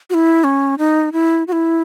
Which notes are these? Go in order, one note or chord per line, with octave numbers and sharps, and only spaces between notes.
F#4
E4
C#4
D#4
E4
F#4
E4